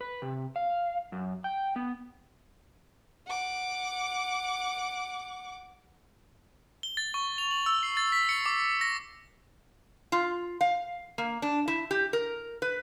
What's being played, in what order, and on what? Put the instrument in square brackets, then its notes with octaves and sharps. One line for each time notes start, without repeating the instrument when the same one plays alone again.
[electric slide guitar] B4
C3
F5
F#2
G5
B3
[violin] F#5 D6
[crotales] G7
A6
C#6
F7
F#7
E6
C7
A6
B6
C#7
D6
A#6
[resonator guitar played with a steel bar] F4
F5
A#3
D4
E4
G4
A#4
B4